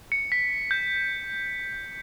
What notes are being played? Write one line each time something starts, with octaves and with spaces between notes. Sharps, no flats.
C#7
B6
G6